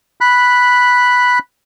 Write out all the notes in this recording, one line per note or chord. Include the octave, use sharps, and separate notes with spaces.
B5 F#6